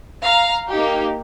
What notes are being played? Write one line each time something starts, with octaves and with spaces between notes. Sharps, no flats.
F5 A#5
A#3 D#4 G4